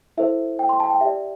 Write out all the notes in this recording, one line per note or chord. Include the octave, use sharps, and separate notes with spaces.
E4 A4 C5 E5
G5
C6
A5
G5
G4 D5 E5